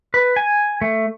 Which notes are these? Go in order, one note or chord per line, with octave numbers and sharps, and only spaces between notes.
B4
G#5
A3